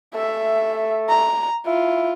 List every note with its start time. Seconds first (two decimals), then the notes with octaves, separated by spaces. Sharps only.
0.15 A3 E5
1.09 A#5
1.66 E4 F4